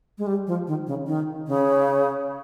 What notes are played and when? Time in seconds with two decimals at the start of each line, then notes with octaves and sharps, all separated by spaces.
0.18 G#3
0.27 G3
0.47 F3
0.67 D#3
0.87 C#3
1.07 D#3
1.48 C#3